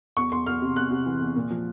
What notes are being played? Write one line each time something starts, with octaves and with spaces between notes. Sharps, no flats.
E2 C#6
E2 C6
E2 F6
C3
E2 F#6
C3
E3
E2
A#2
F3